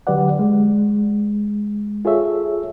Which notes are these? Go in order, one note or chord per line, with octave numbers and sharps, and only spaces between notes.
D3 F#3 G4 B4 D5 F#5
G#3
F4 G#4 A4 C#5 E5